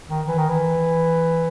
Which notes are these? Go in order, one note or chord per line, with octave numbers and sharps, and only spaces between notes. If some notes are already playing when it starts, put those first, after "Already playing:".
D#3
E3
D#3
E3